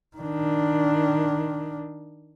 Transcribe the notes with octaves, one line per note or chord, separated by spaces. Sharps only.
D#3 D4